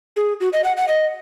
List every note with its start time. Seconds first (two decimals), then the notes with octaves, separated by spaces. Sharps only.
0.17 G#4
0.41 F#4
0.53 D#5
0.64 F#5
0.77 F#5
0.88 D#5